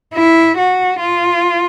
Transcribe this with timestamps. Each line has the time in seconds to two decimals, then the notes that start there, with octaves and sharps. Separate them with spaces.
0.14 E4
0.57 F#4
1.00 F4